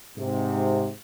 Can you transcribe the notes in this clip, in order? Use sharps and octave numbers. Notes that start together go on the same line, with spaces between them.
G#2 C3